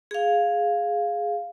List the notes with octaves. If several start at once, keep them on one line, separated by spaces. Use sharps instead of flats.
G#4 F5